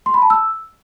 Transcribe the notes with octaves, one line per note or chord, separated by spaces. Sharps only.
C6
B5
A5
E6